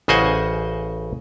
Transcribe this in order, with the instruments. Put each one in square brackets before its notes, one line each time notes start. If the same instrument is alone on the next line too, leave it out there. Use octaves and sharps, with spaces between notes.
[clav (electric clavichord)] A1 C#3 C5 D#5 F#5 G#5